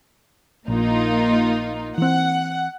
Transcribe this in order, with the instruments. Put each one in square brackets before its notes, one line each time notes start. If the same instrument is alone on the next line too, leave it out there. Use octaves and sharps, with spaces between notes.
[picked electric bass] A#1 [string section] A#3 D#4 F4
[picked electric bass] E3 C4 [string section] F#5